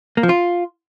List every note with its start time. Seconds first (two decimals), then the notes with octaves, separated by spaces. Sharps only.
0.17 A#3
0.23 F3
0.29 F4